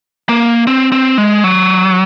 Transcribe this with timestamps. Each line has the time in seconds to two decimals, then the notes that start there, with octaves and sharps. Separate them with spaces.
0.29 A#3
0.67 C4
0.92 C4
1.18 G#3
1.44 F#3